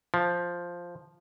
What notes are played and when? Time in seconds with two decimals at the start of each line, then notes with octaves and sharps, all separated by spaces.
0.14 F3